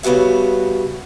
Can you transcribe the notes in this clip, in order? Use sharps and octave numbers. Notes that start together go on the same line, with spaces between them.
C#3 G3 B3 F#4 E5